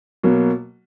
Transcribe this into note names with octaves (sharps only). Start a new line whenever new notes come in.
B2 F#3 A#3